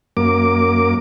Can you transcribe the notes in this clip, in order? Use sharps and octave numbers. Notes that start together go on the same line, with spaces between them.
F#2 A#3 D6